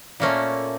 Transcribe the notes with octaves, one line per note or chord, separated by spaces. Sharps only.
A#2 A3 A#3 C#4